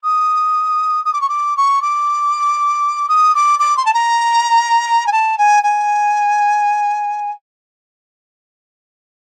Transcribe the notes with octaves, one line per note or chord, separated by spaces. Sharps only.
D#6
D#6
D6
C#6
D6
C#6
D6
D#6
D6
D6
C6
A5
A#5
G#5
A5
G#5
G#5